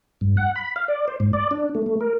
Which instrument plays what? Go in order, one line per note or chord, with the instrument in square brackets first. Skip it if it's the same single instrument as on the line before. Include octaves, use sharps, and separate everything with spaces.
[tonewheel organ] G2
F#5
B5
F5
D5
C5
G#2
D5
D4
A3
A3
A#4